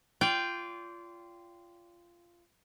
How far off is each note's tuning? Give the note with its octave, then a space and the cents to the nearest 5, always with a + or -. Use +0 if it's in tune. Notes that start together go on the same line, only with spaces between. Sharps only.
F4 -15 D5 -35 G5 +0